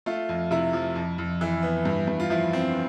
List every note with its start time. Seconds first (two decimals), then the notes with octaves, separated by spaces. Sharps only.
0.06 A3 F4
0.29 F2
0.51 C3 E4
0.73 F3
0.96 F2
1.18 F2
1.41 E3
1.63 B3
1.85 G2
2.07 G2
2.20 F4
2.30 F3 E4
2.53 C4